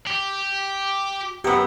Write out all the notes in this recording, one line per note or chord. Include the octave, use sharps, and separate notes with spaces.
G4
F#2 B3 G4 F#5 E6